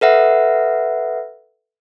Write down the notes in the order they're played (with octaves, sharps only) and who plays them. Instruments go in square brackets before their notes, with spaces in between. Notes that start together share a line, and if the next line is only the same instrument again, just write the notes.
[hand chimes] A4 B4 E5 F#5